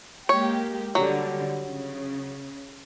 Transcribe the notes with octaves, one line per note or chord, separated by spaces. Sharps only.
G#3 A#3 G4 C#5
D3 F#3 G3
C#3